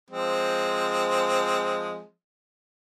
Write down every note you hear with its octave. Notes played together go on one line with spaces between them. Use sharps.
F3 G#3 C4